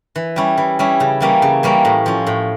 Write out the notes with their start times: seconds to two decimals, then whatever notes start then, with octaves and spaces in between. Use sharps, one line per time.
0.16 E3
0.36 G3 C#4 E4
0.58 E3
0.79 G3 C#4 E4
1.00 C#3
1.20 E3 G3 A#3 C#4
1.42 C#3
1.63 E3 G3 A#3 C#4
1.85 A2
2.06 F3 C#4
2.27 A2